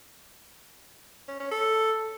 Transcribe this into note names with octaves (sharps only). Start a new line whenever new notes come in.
C#4
C#4
A4